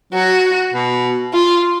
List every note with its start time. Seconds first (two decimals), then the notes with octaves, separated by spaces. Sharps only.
0.13 F#3 F#4
0.73 B2
1.33 F4